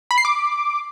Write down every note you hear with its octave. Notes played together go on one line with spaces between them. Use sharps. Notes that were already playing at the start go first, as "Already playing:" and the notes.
B5
C7
D6